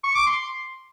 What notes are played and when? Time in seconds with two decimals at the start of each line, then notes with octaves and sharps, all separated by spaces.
0.04 C#6
0.15 D6
0.27 C6